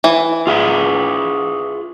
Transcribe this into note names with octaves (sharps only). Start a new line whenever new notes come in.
E3
F4 G#4 E5